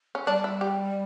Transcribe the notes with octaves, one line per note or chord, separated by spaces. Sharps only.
C#4
G3 D4
E4
G4